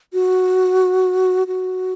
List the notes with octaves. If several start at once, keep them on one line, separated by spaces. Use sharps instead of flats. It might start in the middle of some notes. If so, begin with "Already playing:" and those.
F#4
F#4